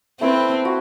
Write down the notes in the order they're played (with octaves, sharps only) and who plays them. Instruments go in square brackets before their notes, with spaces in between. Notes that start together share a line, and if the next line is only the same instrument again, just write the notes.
[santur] A3 E4 B4 [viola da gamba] C4
[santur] F#4